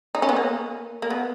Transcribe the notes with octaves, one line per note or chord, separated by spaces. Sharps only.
D#4
C#4
B3
A#3
A#3
B3